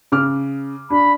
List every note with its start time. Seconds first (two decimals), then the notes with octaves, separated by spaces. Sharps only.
0.12 C#3 D6 F6
0.90 D4 B5